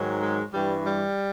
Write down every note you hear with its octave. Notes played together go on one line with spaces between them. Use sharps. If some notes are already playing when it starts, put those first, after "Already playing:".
Already playing: G#2 D#3 F#3
G#3
G2 E3 G3
G3